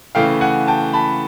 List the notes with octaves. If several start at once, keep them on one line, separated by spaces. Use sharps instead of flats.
C#3 E3 A3 F5 G5
F#5 G#5
G5 A5
A5 B5